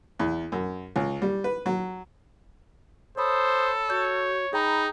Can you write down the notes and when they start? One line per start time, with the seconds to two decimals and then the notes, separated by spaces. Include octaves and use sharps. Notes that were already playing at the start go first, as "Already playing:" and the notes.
0.19 E2
0.52 F#2
0.96 C#2
1.22 G3
1.44 B4
1.66 F#3
3.18 A4 C5 C#5 B5 D#6
3.90 F#4 C#5 G6
4.53 D#4 G#4 G5 A#5 B5